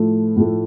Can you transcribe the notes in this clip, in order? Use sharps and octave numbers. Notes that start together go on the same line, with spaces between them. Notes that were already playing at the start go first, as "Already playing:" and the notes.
Already playing: A2 F3 A3
A2 F3 A3